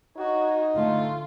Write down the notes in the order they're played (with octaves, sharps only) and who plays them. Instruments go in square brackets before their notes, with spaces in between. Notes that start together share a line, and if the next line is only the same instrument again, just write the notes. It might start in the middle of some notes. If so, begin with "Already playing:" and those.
[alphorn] D#4 [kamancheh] F#4 C#5
[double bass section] D3 A3 [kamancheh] F4